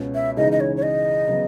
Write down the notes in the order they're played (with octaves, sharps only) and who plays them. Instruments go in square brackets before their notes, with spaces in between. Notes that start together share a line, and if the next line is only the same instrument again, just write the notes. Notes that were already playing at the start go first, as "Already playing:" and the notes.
Already playing: [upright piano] C#2 B2 C#4
[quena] E5
[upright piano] C#3 E3 G#3 D#4 [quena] D#5
[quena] D#5
C#5
C#5
D#5
[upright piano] C#3 F#3 B3